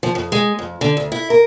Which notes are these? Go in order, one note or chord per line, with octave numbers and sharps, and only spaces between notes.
F3
F2
G#3
F2
D3
D2
E4
A#4